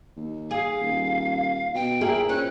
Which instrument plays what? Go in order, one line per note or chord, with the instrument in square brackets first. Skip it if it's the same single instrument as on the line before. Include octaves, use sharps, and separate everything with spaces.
[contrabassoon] D#2
[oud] G#4 [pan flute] F5
[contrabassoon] D#1
[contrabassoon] B2 [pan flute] G5
[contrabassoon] A#2 [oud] E4 G#4 A#4
[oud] C#4 [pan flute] F#6